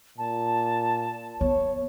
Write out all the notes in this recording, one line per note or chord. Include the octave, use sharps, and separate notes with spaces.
A#2 A5
B3 C#5